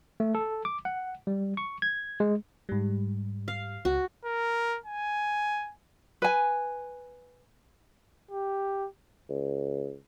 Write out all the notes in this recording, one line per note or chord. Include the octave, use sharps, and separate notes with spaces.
A3
A4
D6
F#5
G3
C#6
G#6
G#3
G#2 G3
F5
C#2 F#4
A#4
G#5
B4 G#5
G4
C#2